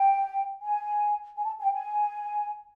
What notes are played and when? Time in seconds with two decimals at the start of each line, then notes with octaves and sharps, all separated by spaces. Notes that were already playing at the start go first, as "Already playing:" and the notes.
Already playing: G5
0.62 G#5
1.36 G#5
1.45 A5
1.60 G#5
1.64 G5
1.73 G#5